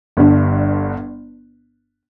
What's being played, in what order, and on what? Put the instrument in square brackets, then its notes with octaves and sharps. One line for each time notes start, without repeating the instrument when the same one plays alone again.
[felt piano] G1 G2 D3